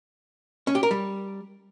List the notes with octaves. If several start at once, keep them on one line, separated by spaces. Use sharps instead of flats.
C#4
G4
A#4
G3